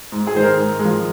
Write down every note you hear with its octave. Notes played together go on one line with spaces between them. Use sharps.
G#2
G#4
D#3 G#3 C5
A#4
G#2
F3 G#3